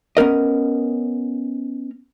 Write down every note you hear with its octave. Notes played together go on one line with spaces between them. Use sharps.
B3 C#4 A#4 D#5